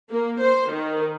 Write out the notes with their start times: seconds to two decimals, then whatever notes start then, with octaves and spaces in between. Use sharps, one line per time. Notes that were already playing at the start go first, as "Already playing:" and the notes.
0.11 A#3
0.42 C5
0.72 D#3